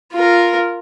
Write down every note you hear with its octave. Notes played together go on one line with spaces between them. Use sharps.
F4 A#4